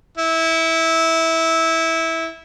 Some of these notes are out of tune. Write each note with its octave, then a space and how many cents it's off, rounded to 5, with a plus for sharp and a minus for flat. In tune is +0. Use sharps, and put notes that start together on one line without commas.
E4 -15